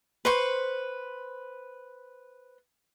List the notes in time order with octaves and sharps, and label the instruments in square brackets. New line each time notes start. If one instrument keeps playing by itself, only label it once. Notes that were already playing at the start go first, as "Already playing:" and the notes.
[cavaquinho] B4 C5 C#6